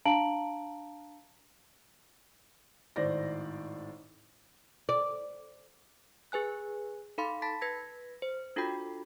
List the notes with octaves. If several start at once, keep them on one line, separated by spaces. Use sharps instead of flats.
D4 F5 A5 A#5 D7 F#7
G#1 A2 C5 D5 A#6
D5
G#4 B4 G#5 F#6
D#4 A4 F5 B5 C6
A5 B5 A6 B6
B4 G#6 A#6 B6
C5
D4 F4 F#4 A4 G5 B5